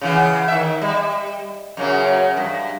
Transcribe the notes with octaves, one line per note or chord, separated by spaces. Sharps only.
C#3 E3 B3
D#3 E5
G3
F#2 C#3 F#3
G2